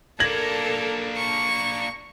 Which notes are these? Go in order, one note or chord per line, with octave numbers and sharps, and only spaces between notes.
A#3 D4 A4 A#4 G#6 A#6 F#7
C#6